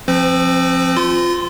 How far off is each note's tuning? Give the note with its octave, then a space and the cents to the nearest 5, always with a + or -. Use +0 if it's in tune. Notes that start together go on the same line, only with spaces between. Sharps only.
F3 +0 C4 +20 C5 -40
F4 +0 C6 -40